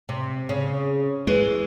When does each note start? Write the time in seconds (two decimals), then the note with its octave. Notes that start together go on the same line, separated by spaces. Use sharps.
0.09 C3
0.49 C#3
1.27 E3 G#3